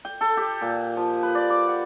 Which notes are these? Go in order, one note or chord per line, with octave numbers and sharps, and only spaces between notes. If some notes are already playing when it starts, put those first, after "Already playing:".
G5
A4
G4
A#2
F3
B4
D5
D6
F#5